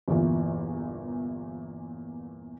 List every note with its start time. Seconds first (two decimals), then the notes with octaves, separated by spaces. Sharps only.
0.08 G1 E2 A#2 E3